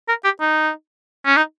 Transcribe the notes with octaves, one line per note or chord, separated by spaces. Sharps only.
A#4
G4
D#4
C#4
D#4